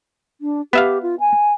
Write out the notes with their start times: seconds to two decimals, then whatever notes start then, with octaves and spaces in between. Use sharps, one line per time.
0.41 D4
0.73 B3 G4 E5 F5
1.03 F4
1.20 G#5